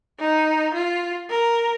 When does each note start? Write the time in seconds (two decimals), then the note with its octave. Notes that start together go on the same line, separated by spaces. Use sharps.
0.20 D#4
0.74 F4
1.30 A#4